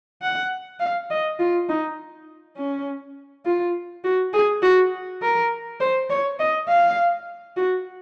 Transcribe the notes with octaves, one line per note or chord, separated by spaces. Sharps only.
F#5
F5
D#5
F4
D#4
C#4
F4
F#4
G#4
F#4
A#4
C5
C#5
D#5
F5
F#4